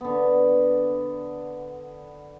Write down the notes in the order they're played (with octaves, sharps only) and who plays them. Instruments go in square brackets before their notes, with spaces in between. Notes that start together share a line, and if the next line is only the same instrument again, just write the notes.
[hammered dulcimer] D3 B3